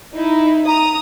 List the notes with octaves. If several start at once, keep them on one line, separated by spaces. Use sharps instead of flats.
D#4 E4
A#5 D#6